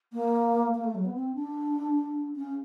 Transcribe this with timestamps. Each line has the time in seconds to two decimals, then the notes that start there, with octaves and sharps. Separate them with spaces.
0.13 A#3
0.74 A#3
0.84 A3
0.95 F#3
1.05 B3
1.14 C4
1.35 D4
2.36 C#4